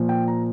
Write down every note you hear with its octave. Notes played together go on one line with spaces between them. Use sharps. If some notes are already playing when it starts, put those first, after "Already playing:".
Already playing: A#2 F3
G5
A#5